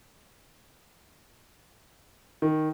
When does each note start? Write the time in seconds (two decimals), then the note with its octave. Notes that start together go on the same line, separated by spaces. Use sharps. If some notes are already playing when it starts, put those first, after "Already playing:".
2.42 D#3